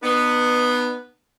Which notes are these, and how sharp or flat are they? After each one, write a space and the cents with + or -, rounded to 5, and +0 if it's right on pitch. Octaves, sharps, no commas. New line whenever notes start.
B3 +0 D#4 -40 B4 +0